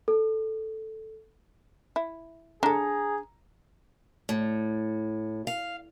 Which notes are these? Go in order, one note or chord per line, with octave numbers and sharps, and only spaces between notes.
A4
E4
D4 G#4 A4 A#5
A2
F5